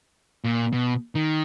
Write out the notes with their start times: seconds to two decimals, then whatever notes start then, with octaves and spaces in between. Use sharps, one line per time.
0.44 A#2
0.73 B2
1.15 D#3